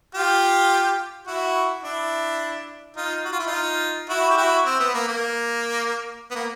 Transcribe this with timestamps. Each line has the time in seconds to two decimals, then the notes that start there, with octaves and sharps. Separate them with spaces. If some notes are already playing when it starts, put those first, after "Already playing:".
0.15 F4 G4
1.27 E4 F#4
1.83 D4 E4
2.96 D#4 F4
3.25 F#4
3.32 F4
3.39 E4
3.47 D#4 F4
4.09 E4 F#4
4.30 G4
4.37 E4 F#4
4.66 C4
4.80 B3
4.94 A#3
5.08 A#3
6.31 B3
6.35 A#3